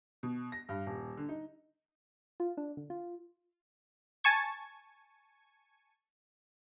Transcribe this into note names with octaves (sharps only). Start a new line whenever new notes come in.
B2
A#6
G2
D#1
D3
D#4
F4
D4
D3
F4
G#5 A5 C#6 G#6